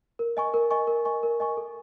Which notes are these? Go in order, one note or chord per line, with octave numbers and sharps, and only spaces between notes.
A#4
D#5 G#5 C#6
A#4
D#5 G#5 C#6
A#4
D#5 G#5 C#6
A#4
D#5 G#5 C#6
A4